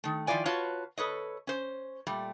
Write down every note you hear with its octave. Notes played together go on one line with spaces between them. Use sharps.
D#3 A3
D#3 F3 E4 F4 D5 G#5
F4 F#4 B4 C#5 A5
A4 B4 C#5 D#5
C#4 C5
A#2 G3 A3